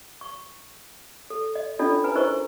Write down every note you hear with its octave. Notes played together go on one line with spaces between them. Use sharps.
C#6
A4
D#5
C#4 D4 E4 F4 A4 D#5
B4 G#5 A#5
E4 A#4 C5 D#5 C#6